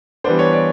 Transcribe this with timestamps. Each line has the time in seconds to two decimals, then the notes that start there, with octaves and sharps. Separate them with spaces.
0.24 E3 G3 B3 D4 C5
0.39 C#5
0.53 D5